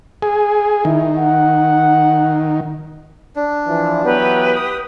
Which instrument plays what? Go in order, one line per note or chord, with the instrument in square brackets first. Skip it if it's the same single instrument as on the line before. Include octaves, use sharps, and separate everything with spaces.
[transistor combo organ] G#4
[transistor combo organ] D#3 [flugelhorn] E4
[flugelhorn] F#5
[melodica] D4
[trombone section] E3 F3
[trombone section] E3 F#3 B3 [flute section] G4 B4
[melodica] D#6